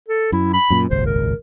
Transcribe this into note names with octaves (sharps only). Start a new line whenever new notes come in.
A4
F#2 E4
B5
F#2 A#2
D#1 G#1 C#2 C5
A#4